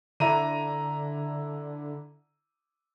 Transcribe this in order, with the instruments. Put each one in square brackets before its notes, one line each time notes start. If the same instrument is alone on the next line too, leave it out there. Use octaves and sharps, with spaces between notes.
[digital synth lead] D3 [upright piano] E4 A#5 D#7